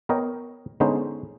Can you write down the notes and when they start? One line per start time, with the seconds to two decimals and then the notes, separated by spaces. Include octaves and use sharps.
0.09 B3 A#4 C#5 D#5 G5
0.80 D3 G#3 B3 C#4 D#4 C5